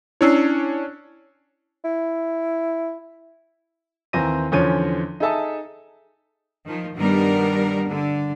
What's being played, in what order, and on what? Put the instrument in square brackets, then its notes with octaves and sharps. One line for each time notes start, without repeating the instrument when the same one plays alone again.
[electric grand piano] C#4 D4 C#5 [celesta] E4 E6 C7
[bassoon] E4
[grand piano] D#2 E3 C4 A#5 A#6 D#7
E2 D3 F3 C#4 C#5 D#7
D#4 G#4 A4 E5 A5 D#6
[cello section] D#3 F3
G2 D#3 G3 B3 D4 A#4
D3